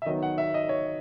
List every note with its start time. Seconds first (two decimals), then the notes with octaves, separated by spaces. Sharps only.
0.02 E5
0.06 D#3 F#3 B3 D#5
0.23 F#5
0.38 E5
0.54 D#5
0.69 C#5